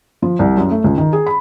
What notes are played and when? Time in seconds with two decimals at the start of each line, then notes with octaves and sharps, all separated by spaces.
0.22 F3
0.39 C2
0.57 F#2
0.71 A3
0.84 C#2
0.98 D#3
1.13 G#4
1.26 B5